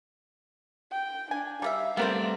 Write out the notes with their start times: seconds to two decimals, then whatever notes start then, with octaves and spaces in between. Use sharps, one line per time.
0.92 G5
1.31 D4 G#5
1.62 G3 A#4 E5 F5
1.97 G3 A3 B3 C4 A#4 C5